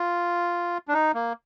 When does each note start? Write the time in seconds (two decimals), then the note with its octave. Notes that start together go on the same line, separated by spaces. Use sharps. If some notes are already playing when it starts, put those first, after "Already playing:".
Already playing: F4
0.88 D4
0.93 D#4
1.14 A#3